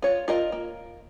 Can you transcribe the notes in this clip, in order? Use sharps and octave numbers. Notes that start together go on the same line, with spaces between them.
F4 C#5
F4 A#4 D#5
A#3